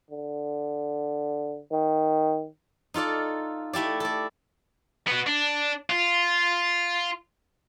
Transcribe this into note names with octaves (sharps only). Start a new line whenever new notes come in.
D3
D#3
D#4 F4 A4 D5
A3 E4 G4 D5
A4 D5
B3 F#4
D4
F4